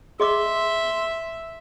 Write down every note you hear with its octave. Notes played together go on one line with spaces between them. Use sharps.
G#4 D#5 E5 C6 D6